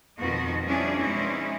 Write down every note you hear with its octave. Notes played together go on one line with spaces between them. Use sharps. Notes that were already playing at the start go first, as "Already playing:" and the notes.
F2 B2 D#3 F3 F#4 D#5
F3 G3 C#4 D4 E4 G#4
B2 G#3 C4 C#4 D#4 E4